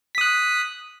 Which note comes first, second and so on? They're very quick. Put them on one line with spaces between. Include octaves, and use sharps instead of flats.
B6 D#6 F#6